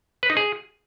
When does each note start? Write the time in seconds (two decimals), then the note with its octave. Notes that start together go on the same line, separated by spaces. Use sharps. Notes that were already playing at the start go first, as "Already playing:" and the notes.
0.23 B4
0.30 D#4
0.37 G#4